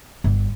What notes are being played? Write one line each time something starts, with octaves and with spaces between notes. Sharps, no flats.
G1